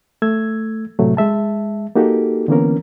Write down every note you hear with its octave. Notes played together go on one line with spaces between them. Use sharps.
A3 E6 G#6
A2 C3 F#3 A3
G#3 E5 A5
A#3 D#4 F#4 G4 A4
D3 E3 A#3 B3 C#4 A#4